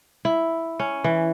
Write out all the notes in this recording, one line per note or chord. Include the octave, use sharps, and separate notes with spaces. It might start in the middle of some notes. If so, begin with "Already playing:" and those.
E4
C#4
E3